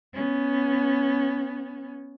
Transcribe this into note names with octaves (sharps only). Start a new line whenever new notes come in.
B3 C#4